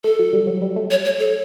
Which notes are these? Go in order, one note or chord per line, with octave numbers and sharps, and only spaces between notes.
A3 A4
F#3
G3
F#3
F#3
G3
A3
C#5
C#5
A4